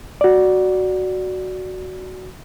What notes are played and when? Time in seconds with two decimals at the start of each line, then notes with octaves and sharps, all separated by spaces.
0.21 F#4 D5